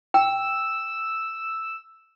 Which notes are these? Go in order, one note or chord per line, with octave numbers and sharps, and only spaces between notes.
G5 E6